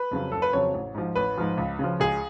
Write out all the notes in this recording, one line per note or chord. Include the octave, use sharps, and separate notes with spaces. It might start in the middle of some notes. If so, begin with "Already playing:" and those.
Already playing: B4
F2 C#3 F#3
F#1 A4
B4
F2 C#3 F#3 C#5
A1
G#2 F3
A1 B4
G#2 F3
C#2
C#3 F3
C#2 G#4